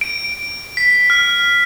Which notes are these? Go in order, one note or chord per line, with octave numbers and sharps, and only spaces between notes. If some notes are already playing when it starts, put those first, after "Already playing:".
D7
B6
F6